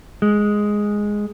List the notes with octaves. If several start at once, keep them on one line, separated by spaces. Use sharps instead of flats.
G#3